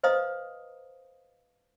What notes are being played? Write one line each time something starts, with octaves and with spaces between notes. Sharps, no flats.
B4 C5 D#5 F5 A#5 D#6